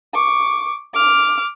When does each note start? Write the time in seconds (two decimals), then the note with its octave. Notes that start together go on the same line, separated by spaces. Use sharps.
0.13 C#6 D6
0.93 D6 F6